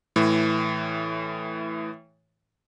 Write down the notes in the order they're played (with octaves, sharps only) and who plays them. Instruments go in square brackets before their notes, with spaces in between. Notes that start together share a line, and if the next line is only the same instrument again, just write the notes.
[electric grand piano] A2 E3